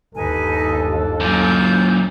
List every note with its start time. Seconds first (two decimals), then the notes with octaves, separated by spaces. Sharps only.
0.15 G1 D#2 D#4 A4 B4 G#5
1.20 F#2 A#2 F4 G6